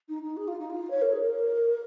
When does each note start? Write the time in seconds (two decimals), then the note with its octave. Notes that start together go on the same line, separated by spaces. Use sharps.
0.09 D#4
0.22 D#4
0.37 G#4
0.48 F4
0.59 D#4
0.70 F4
0.90 C#5
1.02 A#4
1.12 G#4
1.21 A#4